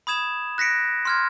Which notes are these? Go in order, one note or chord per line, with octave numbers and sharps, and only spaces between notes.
B5 D#6 G#6 E7
F#6 A#6 B6 C#7 D7
C6 F6 G#6